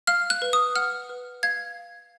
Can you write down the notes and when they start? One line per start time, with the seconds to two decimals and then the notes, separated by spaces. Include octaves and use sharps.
0.07 F5 F6
0.30 F#6
0.42 B4
0.53 D#6
0.76 F#5 F6
1.09 B4
1.43 F5 G#6